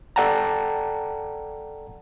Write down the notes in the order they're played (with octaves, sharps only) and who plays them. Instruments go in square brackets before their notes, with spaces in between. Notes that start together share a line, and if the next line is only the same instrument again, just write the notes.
[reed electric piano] A4 D5 F#5 G5 A5 A#5